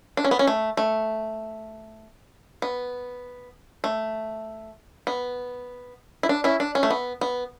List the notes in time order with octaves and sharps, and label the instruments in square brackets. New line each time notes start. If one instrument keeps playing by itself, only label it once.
[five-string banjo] D4
C#4
B3
C#4
A3
A3
B3
A3
B3
E4
D4
C#4 E4
D4
C#4
A3
B3
B3